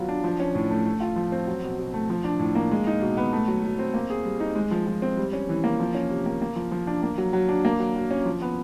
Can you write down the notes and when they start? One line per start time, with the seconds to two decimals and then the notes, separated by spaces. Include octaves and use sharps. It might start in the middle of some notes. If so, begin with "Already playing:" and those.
Already playing: F#3 B3 F4
0.09 D4
0.24 F3
0.40 C#4
0.55 A2
0.71 A3
0.86 A3
1.01 F4
1.16 F3
1.32 C4
1.47 F#3
1.63 B2
1.79 B2
1.94 A3
2.10 F3
2.24 D4
2.39 A2
2.55 A#3
2.71 G#3
2.87 D#4
3.01 B2
3.17 B3
3.33 A3
3.48 F#3
3.63 F#3
3.79 C4
3.94 A#3
4.10 G#4
4.25 G3
4.40 D#4
4.56 G#3
4.71 F3
4.87 F3
5.02 C4
5.17 G3
5.33 C#4
5.49 E3
5.64 A#3
5.80 F3
5.95 C#4
6.10 C3
6.26 A#3
6.42 A#3
6.56 F3
6.71 F3
6.87 D4
7.03 A#3
7.18 F#3
7.33 F#3
7.49 D4
7.65 A#3
7.79 F#3
7.96 F#3
8.11 C#4
8.26 F3
8.42 B3